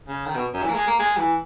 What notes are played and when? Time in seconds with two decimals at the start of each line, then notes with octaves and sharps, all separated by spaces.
0.08 C#3
0.27 D#3
0.36 B2
0.54 F#2
0.63 E3
0.70 A#3
0.75 G#3
0.87 A#3
0.99 G#3
1.17 E3